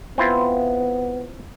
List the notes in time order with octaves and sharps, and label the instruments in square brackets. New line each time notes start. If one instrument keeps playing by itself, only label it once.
[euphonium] B3 [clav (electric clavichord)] C4 E4 F4